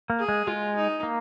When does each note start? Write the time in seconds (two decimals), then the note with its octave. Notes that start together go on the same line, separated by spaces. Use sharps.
0.10 A#3
0.19 G#4
0.29 G#3
0.47 G#3 F4
0.76 D#4
1.03 A#3